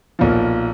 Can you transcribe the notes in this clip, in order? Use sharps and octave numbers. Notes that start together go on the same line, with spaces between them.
B1 A#2 F3